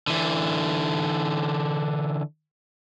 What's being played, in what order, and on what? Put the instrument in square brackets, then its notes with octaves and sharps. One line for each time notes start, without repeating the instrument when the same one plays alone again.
[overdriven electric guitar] D3 E3